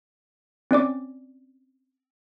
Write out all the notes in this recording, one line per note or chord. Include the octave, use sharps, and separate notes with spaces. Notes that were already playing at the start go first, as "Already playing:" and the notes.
C4 C#4 D5 D6